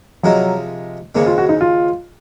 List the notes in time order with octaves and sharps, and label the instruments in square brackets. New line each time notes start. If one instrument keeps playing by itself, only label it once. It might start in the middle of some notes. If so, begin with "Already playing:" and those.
[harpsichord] C3 F3 G#3 D#4 A#4 [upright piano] F#3
[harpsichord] D#2 C#3 G#3 C4 [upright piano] A#3
[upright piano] F4
F#4
D#4
F4